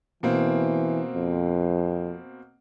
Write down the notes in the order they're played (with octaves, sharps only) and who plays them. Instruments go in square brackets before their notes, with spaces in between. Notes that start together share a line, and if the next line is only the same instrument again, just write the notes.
[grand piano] B2 A#3 C4 [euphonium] E3
[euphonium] F2